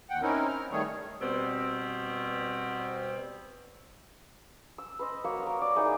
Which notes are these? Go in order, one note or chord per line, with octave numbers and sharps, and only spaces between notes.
D#2 F#5 G5
C4 C#4 D#4 E4 A#4
F6
D#3 G3 A3 G#4 C#5
B2 G3 B3 C4
E6
B4 C5 D#5
A#3 F#4 C#5
A#4 D#5
D5
A#3 D#4 E4 G#4